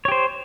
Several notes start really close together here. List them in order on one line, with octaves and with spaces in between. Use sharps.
C#5 G4 C5